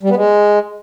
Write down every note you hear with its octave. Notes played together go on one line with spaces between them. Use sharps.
G3
B3
G#3